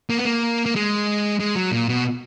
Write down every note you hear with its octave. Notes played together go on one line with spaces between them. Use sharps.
A#3
B3
A#3
A#3
G#3
G#3
F#3
A#2
B2